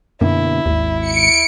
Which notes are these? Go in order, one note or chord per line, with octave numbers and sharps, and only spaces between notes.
F#2 B2 D3 A#3 E4
G#1 D#2
C#7 D7